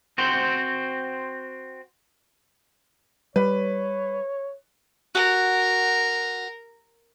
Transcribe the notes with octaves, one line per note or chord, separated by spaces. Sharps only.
C4 F#4 C5
G3 B4 C#5
F#4 A#4